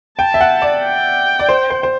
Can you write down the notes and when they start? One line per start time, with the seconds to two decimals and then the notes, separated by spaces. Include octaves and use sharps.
0.18 G5 A5
0.34 E5
0.41 F#5
0.62 D5
0.83 G5
1.39 D5
1.49 C5
1.70 C5
1.83 C5